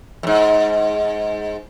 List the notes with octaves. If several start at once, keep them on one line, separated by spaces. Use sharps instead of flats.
F2 G#2